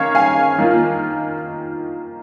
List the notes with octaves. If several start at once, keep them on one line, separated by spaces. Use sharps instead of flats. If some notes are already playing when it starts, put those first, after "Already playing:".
Already playing: D#3 A#3 C#4 C#5 F5
F5 G#5
D#3 A#3 F4